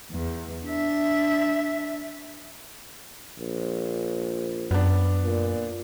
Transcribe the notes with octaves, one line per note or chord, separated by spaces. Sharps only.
E2
D4 E5
A#1
F#2 B3 D4
A#2